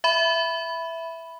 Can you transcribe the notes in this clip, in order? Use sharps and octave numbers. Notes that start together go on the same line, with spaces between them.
E5 B5